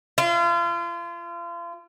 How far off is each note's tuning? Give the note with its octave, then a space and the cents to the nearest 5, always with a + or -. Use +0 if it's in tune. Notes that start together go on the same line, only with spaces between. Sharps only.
F4 -35